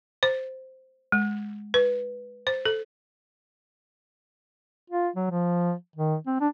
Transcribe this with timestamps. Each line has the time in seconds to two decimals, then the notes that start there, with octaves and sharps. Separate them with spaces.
0.23 C5
1.12 G#3
1.74 B4
2.47 C5
2.65 A4
4.90 F4
5.16 F#3
5.30 F3
5.96 D#3
6.27 C4
6.40 D4